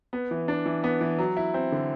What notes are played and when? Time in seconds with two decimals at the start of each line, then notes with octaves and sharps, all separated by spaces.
0.13 B3
0.31 E3
0.48 D4
0.66 E3
0.84 B3
1.01 E3
1.19 F#3
1.37 E4
1.54 C4
1.72 D3